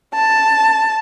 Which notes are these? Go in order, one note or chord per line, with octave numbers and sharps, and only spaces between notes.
A5